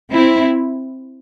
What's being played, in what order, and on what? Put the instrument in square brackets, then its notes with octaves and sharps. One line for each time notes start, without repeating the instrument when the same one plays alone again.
[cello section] C4 E4